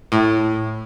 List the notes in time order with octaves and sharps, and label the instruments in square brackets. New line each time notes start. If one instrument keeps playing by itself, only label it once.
[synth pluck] A2